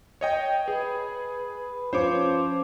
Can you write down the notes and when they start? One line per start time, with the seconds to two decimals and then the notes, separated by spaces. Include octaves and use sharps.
0.21 C#5 D#5 G5
0.68 G#4 B4
1.93 F3 C#4 C5 C#5 D6